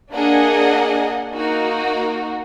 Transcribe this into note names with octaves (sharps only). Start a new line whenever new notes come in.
A#3 D4 G#4 D#5 F#5
A#3 D#4 F#4